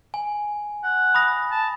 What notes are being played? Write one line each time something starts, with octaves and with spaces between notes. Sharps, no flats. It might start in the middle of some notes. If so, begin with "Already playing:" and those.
G#5
F#5
B5 D#6 A#6
A5